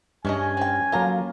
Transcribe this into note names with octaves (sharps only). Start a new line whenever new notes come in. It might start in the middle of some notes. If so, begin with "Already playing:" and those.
G2 G#3 A3 C#4 D#5 G#5
C4 G5
F#3 A#3 F4 A4 A#5